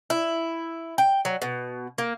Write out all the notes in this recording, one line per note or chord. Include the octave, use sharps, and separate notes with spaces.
E4
G5
F#3
B2
A#3